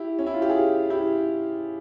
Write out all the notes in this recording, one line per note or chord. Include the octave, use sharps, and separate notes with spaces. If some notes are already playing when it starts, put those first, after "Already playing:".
Already playing: E4 G4
C#4
E4
F4
G4
F4 G#4
E4 G4